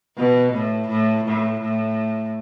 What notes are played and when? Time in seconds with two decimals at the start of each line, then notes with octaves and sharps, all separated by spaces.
0.18 B2
0.53 A2
0.89 A2
1.25 A2
1.61 A2